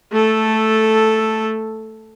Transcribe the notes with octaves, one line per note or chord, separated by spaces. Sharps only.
A3 A4